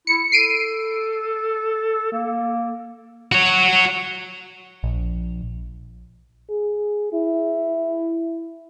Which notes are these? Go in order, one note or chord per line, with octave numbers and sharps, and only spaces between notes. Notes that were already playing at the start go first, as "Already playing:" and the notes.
E4 C#7
A4 C7 D7 D#7
A#3
F#4 C#5
A#1
G#4
E4